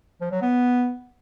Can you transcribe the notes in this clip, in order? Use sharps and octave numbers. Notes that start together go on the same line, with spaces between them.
F3
F#3
B3